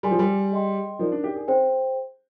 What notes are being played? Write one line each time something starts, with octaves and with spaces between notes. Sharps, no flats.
G3 G#4 D5 G#5 C6
F3
G3
G#4 D#5 G5 C6
F3 D#4 A#4 D5
D4
G4
G#4
C4 G#4 C5 G5